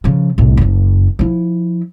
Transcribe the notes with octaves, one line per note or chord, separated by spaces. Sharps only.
C#3 F3
C2 A2
F#1 F#2
F3 E4